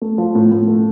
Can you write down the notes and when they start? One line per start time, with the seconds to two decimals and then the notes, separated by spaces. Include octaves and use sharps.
0.02 A3
0.18 F3
0.35 A2
0.52 A2
0.68 A3